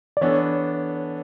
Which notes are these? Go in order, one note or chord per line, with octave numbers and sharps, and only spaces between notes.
D5
E3 B3 D4 A4 C#5